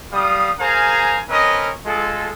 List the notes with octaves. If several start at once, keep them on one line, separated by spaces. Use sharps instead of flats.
G3 F5 D#6
G#4 A#4 C5 F5 G#5 A#5
C4 C#4 A#4 B4 D#5
G#3 F4 A4